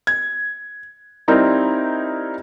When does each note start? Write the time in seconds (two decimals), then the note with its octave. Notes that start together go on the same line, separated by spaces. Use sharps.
0.07 G#6
1.28 G3 C4 D#4 E4 A#4